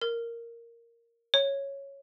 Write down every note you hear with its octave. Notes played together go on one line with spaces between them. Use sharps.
A#4
C#5